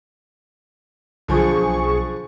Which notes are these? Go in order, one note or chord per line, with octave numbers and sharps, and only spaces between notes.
B1 D3 F3 G#4 C#6